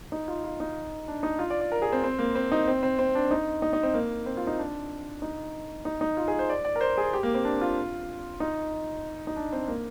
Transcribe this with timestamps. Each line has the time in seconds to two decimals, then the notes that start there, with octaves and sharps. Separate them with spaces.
0.12 D#4
0.28 F4
0.44 F4
0.60 D#4
1.08 D4
1.23 D#4
1.39 F4
1.50 D5
1.61 D5
1.72 A#4
1.82 G#4
1.92 C4
2.04 C4
2.19 A#3
2.35 C4
2.52 D#4
2.67 C4
2.83 C4
2.99 C4
3.15 D4
3.31 D#4
3.62 D#4
3.73 D#4
3.83 C4
3.94 A#3
4.26 C4
4.37 F4
4.47 D#4
4.59 D4
5.22 D#4
5.85 D#4
6.01 D#4
6.17 F4
6.28 G#4
6.39 C5
6.49 D5
6.65 D5
6.76 A#4
6.81 C5
6.98 G#4
7.13 G4
7.23 A#3
7.34 C4
7.45 D4
7.61 F4
8.40 D#4
9.27 D#4
9.36 D4
9.52 C4
9.68 A#3